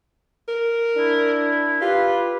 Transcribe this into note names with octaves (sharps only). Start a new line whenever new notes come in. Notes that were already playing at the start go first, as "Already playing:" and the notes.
A#4
D4 E4
F4 G4 B4